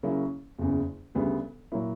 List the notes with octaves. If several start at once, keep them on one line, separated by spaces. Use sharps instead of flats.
C#3 F#3 A#3 C#4 E4
F#1 E2 C#3
D2 C#3 G3 B3 D4
A#2 F#3 A#3 E4